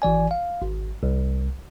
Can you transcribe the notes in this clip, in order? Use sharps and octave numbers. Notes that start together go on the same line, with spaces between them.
G#1 E3 D5 G#5
F5
G#1
C2